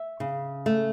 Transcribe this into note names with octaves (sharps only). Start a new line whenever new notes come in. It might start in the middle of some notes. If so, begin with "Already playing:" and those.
Already playing: E5
C#3
A3